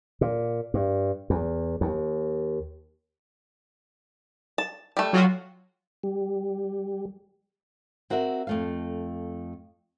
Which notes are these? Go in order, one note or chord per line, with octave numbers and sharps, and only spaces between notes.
A#2
G2
E2
D#2
A5
G3 A3
F#3 F4 F#4
G3
C4 F#4 A#4 E5 F#5
F2 A3 F5